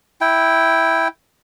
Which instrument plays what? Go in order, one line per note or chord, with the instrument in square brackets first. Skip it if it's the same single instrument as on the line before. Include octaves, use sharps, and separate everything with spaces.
[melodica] E4 G5